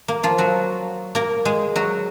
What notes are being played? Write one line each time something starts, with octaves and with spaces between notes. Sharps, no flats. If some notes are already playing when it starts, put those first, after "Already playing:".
A#3
F3 F4
F#3 F#4
A#3 A#4
G#3 G#4
F#3 F#4